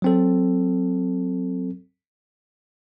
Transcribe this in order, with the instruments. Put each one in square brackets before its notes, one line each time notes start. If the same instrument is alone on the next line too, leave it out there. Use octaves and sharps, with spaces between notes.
[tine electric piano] F#3 C4 A4